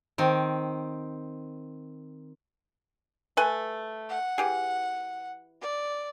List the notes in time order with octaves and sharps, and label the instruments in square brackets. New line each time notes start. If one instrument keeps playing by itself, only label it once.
[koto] D#3 C4
[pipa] A3 B4 G#5
[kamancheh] F#5
[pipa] E3 G4 G#4
[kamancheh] D5